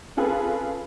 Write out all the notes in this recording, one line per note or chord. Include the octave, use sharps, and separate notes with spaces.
C4 C#4 F4 G#4 A4 B4